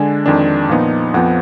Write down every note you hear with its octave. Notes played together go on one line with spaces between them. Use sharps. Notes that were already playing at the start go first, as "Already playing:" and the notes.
Already playing: D3 G#3 D4 G#5
F2 D#3 G#3 D4
A#2 F3 B3 D#4
F2 F3 B3 F#5